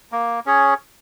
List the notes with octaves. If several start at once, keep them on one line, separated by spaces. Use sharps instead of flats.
A#3
C#4 G#4 C#5